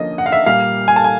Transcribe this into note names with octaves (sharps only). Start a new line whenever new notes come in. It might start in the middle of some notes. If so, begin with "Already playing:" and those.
Already playing: D3 F3 A#3 C#4 D#5
F#5
F5
E5
A#2 G3 A#3 F5
G#5
A5
G#5